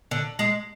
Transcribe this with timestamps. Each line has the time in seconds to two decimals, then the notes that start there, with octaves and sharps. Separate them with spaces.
0.11 D3
0.39 G#3